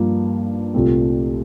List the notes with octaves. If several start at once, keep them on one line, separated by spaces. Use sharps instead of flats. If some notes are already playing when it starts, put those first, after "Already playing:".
Already playing: G2 F3 A#3
C2 A#2 A3 C4